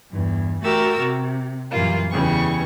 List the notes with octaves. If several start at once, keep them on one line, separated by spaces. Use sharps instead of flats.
E2 G2
A3 F#4 G4 A#4 E6 A6
C3
F#2 A#2 E3 G3 A#3 F4
E2 C#3 E3 G3 C#6